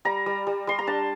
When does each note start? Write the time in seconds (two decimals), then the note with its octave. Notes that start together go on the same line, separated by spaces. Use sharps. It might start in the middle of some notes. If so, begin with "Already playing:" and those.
0.05 G3 A#5
0.26 G3
0.47 G3
0.67 G3 C6
0.79 A#5
0.87 D4 A5